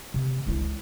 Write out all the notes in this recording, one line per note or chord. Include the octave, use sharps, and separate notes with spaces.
C3
C#2 E4